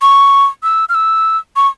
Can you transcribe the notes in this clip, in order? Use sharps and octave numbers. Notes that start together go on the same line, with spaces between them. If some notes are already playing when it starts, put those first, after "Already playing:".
C#6
E6
F6
E6
C#6